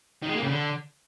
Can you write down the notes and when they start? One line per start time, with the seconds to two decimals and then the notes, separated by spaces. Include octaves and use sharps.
0.23 D#3
0.29 G#3
0.36 A#3
0.43 C#3
0.49 D3